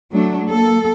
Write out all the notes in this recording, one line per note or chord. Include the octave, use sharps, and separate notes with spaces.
F#3 A3 D4
A#3 A4